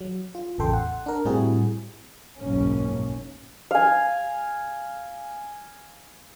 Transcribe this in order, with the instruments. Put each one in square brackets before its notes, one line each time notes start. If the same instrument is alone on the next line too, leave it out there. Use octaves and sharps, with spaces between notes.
[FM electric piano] F#3
F4
A1 E2 C#3 A4 G5 C6
F#5
D4 A#4
A2 G3 C4 E4 F#4 G#4
[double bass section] F#1 B1 G#2 A#3 C#4
[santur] F5 G#5